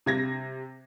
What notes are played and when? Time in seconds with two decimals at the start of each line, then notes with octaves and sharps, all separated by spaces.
0.06 C3 G#6 A#6